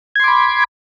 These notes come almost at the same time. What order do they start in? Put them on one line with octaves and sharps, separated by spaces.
G#6 C6 D6 B5